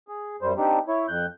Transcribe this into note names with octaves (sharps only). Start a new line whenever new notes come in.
G#4
F#2 G3 C5
C4 D4 D#4 G4
E4 C#5
F2 F#6 G6